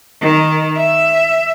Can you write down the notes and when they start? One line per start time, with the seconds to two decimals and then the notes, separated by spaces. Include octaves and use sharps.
0.21 D#3
0.77 E5